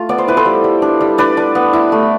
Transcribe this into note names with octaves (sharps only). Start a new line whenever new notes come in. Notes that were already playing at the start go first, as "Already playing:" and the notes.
Already playing: A3 F4
B3 D5
C5
E4 B4
A4 C5
G3
G3
D4
G3
D4 B4 D5
D4
B3
E4
A3